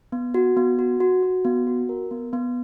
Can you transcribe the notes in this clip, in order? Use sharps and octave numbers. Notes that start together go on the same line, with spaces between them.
B3
F#4
B3
F#4
F#4
F#4
B3
F#4
A#4
B3
B3